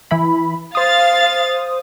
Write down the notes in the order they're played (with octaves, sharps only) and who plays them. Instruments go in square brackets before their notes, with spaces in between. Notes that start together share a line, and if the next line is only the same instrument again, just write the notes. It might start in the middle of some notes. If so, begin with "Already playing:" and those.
[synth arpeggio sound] E3 E4 B5
[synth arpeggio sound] C5 D#6 [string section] F5 A6